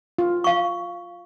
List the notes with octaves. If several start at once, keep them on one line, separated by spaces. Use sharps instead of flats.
F4
F5 C#6